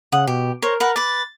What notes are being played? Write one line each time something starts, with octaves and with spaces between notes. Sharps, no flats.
C#3 F#5 D#6
B2 G4
A#4 C5 C#5
A#4 B4 F#5
B4 D6 A6